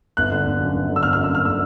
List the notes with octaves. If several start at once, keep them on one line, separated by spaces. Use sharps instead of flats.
G1 F#6
D3
G1
F#2
G1
D3
E6
G1 F6
F6
F#2
E6
G1 F6
D3 E6